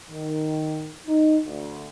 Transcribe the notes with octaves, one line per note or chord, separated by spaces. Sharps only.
D#3
D#4
D2